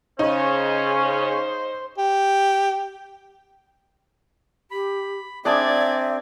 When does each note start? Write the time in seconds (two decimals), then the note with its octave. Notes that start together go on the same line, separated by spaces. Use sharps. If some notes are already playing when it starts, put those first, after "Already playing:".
0.19 C#3 C#4 D#4 C5
1.98 G4
4.71 G4 B5
5.45 C4 D4 G#4 D5 E5 A5 G#6